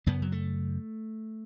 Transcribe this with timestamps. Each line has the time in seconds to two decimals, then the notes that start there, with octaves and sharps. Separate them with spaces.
0.07 F#2 C#3 B3
0.22 F#3
0.32 A3